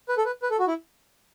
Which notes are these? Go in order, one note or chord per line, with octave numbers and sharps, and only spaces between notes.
B4
A4
B4
B4
A4
F#4
E4